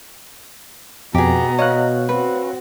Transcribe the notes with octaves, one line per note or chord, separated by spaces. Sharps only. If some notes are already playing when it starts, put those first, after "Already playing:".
F2 B2 B3 G4 G#4 A#5
C#5 D#5 F5 F#6
C4 F#4 B4